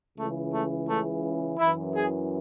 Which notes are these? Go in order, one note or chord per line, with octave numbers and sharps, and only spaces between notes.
C#2 C#3 E3 A3
A3
A3
F#2 E3 E4
G#4